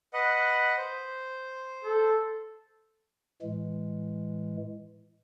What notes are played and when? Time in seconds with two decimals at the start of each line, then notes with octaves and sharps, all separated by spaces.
0.13 B4 D#5 F#5
0.78 C5
1.84 A4
3.42 A2 E3 G#3